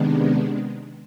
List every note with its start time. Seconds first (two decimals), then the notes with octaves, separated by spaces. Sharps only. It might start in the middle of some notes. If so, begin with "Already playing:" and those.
Already playing: C3 D#3 G#3 B3 D4